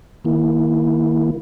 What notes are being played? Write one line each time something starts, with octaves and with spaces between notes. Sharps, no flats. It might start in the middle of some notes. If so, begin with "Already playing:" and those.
D#3 A#3 E4